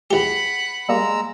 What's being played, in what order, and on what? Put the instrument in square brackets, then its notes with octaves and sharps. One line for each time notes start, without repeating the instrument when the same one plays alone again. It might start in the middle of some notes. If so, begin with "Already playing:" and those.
[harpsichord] E2 G4 [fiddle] F#5 B5
[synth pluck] G3 A#3 [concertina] G#3 A#5 E6